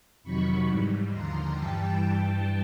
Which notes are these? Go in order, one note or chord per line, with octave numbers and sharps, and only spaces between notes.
F2 C3 D#3 F#3 B5 C#6
G#2 E3 G3
D#2 D3 F3 A#5 C6
G2 E3 G3 G5 A5